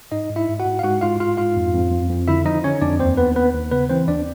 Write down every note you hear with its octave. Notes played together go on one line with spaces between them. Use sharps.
G#2 D#4 D#5
G#2
E4 E5
G#2
F#4 F#5
G#2
F5
G#2 F#4 F#5
G#2 F4 F5
G#2 F4 F5
G#2 F4 F5
F2
F2
F2
F2
D3 E4 E5
F3 D#4 D#5
D3 C#4 C#5
F2 D4 D5
D#2 C4 C5
D#2 B3 B4
D#2 B3 B4
D#2
C#3 B3 B4
E3 C4 C5
D#2 D4 D5